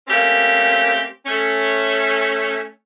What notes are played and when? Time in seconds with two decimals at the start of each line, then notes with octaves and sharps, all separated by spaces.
0.08 A3 A#3 C4 C#4 G4
1.26 A3 C#4